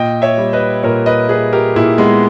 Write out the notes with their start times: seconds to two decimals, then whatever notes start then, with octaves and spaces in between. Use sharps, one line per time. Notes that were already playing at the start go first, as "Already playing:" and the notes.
Already playing: A#2 D#5 G5
0.22 C#5 E5
0.38 G3
0.53 B4 D#5
0.83 A#2 A#4 C#5
1.06 B4 D#5
1.29 G3 G#4 B4
1.53 G4 A#4
1.76 A#2 E4 G#4
1.98 G#3 B3